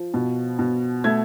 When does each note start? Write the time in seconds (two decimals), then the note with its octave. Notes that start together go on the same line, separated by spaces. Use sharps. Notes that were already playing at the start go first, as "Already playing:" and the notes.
Already playing: F3
0.14 B2
0.59 B2
1.04 A3 G#6